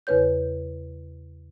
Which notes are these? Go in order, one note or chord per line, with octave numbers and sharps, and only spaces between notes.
E2 C#3 B4 C#5 G6